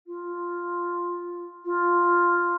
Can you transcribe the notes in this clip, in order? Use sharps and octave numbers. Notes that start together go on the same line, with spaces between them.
F4
F4